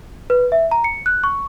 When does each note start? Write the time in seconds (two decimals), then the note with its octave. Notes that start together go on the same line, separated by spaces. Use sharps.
0.30 B4
0.52 E5
0.71 A#5
0.84 C#7
1.06 F#6
1.24 C#6